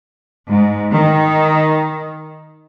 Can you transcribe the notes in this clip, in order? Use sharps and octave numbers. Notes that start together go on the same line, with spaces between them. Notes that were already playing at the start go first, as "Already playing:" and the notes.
G#2
D#3